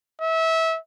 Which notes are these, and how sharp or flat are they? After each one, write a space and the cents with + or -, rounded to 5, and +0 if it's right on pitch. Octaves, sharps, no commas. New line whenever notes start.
E5 -25